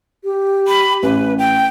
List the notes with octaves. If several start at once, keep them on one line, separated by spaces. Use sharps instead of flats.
G4
B5
A1 B4
G5